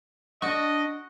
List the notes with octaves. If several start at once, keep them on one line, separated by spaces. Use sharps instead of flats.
D4 F#4 D5 D#5 C#6